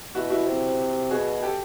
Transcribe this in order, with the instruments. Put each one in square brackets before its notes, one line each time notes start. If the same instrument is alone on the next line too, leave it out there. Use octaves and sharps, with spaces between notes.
[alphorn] B2 [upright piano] E4 F#4
[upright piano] E4 F#4
[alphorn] C3
[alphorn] B2 [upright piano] F#4 G#4
[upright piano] G4 A4